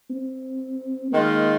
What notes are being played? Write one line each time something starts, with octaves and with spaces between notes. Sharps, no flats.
C4
D#3 G#3 A#3 F4